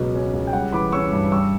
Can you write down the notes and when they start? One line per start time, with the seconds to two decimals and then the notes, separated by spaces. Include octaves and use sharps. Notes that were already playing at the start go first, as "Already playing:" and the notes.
Already playing: C#2 B2 F#3
0.14 C#4
0.33 C#2
0.47 G5
0.53 G3 F#5
0.72 E3 B5 D6
0.92 C#4 C#6 E6
1.12 G2
1.32 G3 C#6 E6